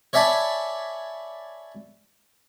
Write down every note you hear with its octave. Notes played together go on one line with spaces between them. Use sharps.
C#5 D5 E5 G#5 A5 B5